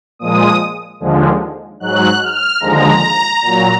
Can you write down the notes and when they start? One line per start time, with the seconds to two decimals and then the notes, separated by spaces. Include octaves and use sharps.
0.19 A#2 F3 G#3 D#6
1.00 D#2 D3 F3 G#3
1.80 G#2 F#3 F#6
2.21 F6
2.60 D#2 D3 F3 G#3 A#5
3.41 A#2 F#3